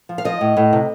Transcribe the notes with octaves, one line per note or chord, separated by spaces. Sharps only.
F3
F5
F3 D#5
A2
A2
C3